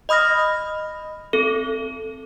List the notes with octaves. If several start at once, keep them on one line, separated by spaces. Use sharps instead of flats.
D#5 B5 D#6 F6 A#6
C4 A4